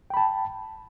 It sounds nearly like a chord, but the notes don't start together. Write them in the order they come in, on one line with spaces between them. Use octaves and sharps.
G5 B5 A5